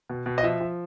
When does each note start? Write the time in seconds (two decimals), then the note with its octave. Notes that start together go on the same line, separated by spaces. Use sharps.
0.10 B2
0.26 B2
0.38 D#5
0.43 F3 E5
0.60 F3